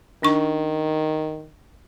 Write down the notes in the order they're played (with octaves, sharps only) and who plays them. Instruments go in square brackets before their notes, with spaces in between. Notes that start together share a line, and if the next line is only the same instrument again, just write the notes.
[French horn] D#3 [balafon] D4 C#6